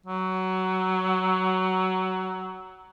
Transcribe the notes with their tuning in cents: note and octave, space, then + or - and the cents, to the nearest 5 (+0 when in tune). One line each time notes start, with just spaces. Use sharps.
F#3 +15